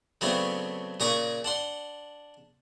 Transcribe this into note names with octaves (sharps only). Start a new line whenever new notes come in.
C#3 F#3 A3 B3 C4 D4
A#2 C#3 G#4 A#5 C#6 D6
D4 F#5 C6